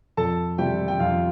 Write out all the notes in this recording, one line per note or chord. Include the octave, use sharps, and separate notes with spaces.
F2 A4 A5
C3 G3 G4 G5
G5
F2 F4 F5